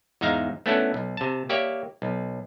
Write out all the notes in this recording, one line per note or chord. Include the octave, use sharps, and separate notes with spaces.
E2 G#2 D#4 E5 F5 A#5
A3 B3 C#4 D4 E4 A4
B1
C3 A5
A#3 G4 C#5 D5 E5
B1